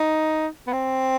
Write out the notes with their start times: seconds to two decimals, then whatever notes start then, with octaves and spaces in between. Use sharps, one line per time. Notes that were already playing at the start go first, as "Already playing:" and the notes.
Already playing: D#4
0.67 B3
0.73 C4